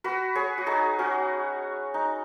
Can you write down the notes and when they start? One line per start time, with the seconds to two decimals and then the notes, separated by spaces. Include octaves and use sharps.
0.04 F#4 B4
0.35 G#4 C#5
0.58 F#4
0.66 D#4 G#4
0.99 C#4 F#4
1.94 D#4